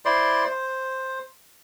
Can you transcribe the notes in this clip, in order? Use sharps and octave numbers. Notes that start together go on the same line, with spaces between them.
E4 C5 D5 C6
C5